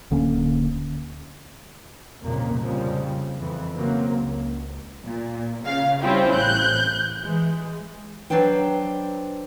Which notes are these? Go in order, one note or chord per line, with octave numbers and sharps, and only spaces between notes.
D1 D3 A#3 C#4
C2 F2 A#2 C#3 A#3
F2 C#3 F3 G3
F2 E3
C#3 F#3 A#3 C4
C#2
A#2
C#3 F5
G3 C4 C#4 E4 F4 G4
A1 F#6 G6
E3 G#3
F#3 D4 B4 C5 G5